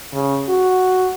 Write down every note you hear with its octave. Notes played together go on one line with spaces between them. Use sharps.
C#3
F#4